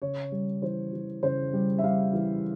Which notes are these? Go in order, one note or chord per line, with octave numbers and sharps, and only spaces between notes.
C#3 C#5
G3
E3 C5
E3
C#3 C5
G3
E5
G3 F5
E3